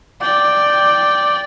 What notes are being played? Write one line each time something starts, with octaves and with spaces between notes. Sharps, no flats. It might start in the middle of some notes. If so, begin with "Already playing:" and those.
D5 G5